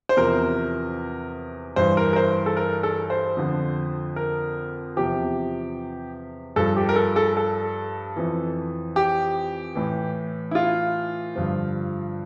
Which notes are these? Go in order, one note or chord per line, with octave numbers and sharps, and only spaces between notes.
C5
E2 C3 F3 A#4
G2 E3 C5
A#4
A#4
C5
A4
A#4
A4
C5
F2 D3 F3
A#4
E2 C3 F3 G4
G2 F3 A4
G4
A#4
A4
A4
A4
F2 E3
G4
A2 E3
E4
F4
G2 D3 F3